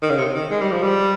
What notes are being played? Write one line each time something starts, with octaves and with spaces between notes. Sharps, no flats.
D#3
C#3
C3
D#3
G#3
G3
F3
G3